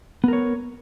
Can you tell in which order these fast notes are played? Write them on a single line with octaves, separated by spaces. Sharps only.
B3 A#4 C#5